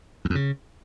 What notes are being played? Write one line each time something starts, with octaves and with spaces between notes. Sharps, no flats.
E2
F2
C#3